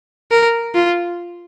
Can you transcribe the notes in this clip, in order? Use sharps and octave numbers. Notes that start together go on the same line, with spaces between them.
A#4
F4